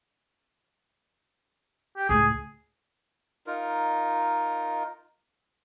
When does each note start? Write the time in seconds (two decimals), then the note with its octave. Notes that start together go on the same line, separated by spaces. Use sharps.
1.97 G4
2.09 C#2 A2 G#4
3.47 D#4 F4 A#4